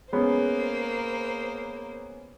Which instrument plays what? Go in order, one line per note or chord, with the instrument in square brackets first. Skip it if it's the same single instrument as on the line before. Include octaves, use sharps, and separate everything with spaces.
[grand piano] G#3 B3 C#4 [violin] A#3 C5